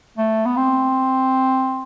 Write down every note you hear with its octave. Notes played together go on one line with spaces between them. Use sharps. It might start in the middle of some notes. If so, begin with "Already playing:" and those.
A3
B3
C4